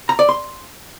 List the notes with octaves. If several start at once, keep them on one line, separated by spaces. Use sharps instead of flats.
A#5
D5
C6